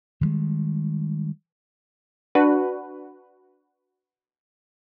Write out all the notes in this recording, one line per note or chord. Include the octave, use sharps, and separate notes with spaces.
D#3 F3 G3 G#3
D4 F#4 B4